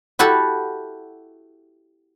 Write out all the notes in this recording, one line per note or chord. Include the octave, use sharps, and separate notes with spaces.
E4 F#4 G4 A4